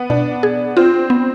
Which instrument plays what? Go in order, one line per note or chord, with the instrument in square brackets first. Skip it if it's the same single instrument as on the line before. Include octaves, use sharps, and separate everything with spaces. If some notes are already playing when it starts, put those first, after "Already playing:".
Already playing: [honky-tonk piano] B3
[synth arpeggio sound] B2 [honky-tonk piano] D4
[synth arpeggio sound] G#4
[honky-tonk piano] C4 [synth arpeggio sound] F4
[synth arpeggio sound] B3